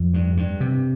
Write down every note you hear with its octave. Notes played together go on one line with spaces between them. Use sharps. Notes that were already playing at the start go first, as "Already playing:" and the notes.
Already playing: F2
G2
G2
C3